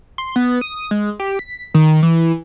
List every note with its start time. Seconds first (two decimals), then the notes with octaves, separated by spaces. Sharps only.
0.18 C6
0.36 B3
0.61 D#6
0.91 G#3
1.20 G4
1.39 B6
1.74 D#3
2.03 E3